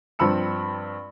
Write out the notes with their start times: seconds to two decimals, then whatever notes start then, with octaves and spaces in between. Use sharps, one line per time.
0.19 G2 F3 C4 B5 E6 C#7